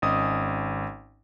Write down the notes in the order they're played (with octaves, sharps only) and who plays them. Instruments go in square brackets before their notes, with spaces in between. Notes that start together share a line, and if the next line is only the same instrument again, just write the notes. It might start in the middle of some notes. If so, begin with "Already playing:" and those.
[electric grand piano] G#1 C#4 D#5 D#6